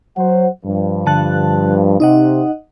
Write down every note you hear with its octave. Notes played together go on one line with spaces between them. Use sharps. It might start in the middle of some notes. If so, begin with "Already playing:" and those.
F#3 C5 F#5
G2 F3
D3 A5 F#6
C3 D#4 D#5 F#5